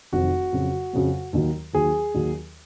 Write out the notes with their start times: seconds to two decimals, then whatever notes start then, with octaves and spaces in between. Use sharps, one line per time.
0.12 F1 F2 D#3 F#3 F#4
0.53 F2 C#3 F#3
0.93 F2 C#3 F#3
1.33 D#2 D#3 F#3
1.73 D#2 D#3 F#3 G#4
2.14 D#2 D#3 F#3